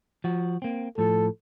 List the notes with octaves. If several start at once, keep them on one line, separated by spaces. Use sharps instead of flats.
F3 F#4
A#3 C4
A2 F3 A4